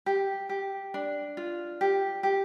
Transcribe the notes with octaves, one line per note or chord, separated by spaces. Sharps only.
G4
G4
D4
F4
G4
G4